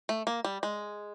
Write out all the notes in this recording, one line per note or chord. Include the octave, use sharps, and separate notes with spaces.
A3
A#3
G3
G#3